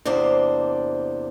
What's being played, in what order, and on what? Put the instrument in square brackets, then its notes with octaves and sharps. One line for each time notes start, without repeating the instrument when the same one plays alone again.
[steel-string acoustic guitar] E2 C3 A#3 D4 C5